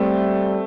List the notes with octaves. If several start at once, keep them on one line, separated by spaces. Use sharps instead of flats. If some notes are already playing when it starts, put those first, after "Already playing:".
Already playing: G3 A3 C4